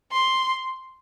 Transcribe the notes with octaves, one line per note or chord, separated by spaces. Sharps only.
C6